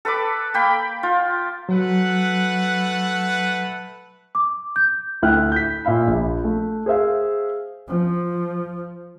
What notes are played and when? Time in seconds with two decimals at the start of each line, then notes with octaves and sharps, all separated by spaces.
0.05 A4 B4 B5 D6
0.54 A#3 G5 B5
1.03 F4
1.69 F#3 A3 B4 F#5
4.35 D6
4.76 G6
5.22 D2 E4 G5 F6 F#6
5.52 G6 B6
5.85 A#2 E5 F5 B5
6.07 A#1
6.44 A3
6.86 G#4 C5 E5 F5
7.88 F3